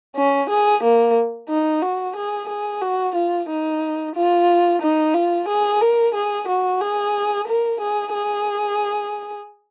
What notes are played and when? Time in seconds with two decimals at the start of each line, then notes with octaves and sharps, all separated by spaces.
0.16 C#4
0.49 G#4
0.83 A#3
1.49 D#4
1.82 F#4
2.16 G#4
2.48 G#4
2.81 F#4
3.15 F4
3.49 D#4
4.16 F4
4.82 D#4
5.14 F4
5.48 G#4
5.81 A#4
6.14 G#4
6.48 F#4
6.81 G#4
7.47 A#4
7.80 G#4
8.14 G#4